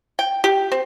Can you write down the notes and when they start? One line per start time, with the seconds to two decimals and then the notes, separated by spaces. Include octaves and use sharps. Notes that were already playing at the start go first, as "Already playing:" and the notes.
0.19 G5
0.44 G4
0.72 C4